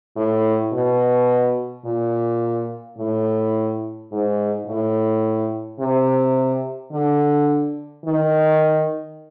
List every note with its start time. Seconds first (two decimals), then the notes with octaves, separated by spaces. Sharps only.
0.16 A2
0.73 B2
1.85 A#2
2.98 A2
4.11 G#2
4.67 A2
5.79 C3
6.92 D3
8.05 D#3